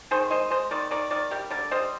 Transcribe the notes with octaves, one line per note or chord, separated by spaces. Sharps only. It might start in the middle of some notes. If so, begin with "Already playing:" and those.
D#3 G#4 C5
G#3 C5 D#5
G#3 C5 D#5
D#3 A#4 D5
D#3 A#4 D5
D#3 A#4 D5
G3 G4 A#4
D3 A#4 D5
G3 C5 D#5